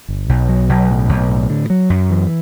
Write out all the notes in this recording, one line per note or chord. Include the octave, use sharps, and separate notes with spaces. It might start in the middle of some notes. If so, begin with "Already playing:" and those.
G1
B1
F#3
B1
A2
B1
A2
D3
F#3
F#2
E3